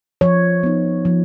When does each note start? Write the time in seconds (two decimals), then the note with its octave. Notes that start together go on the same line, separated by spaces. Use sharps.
0.21 F3 C#5
0.63 B3 D#4
1.05 F3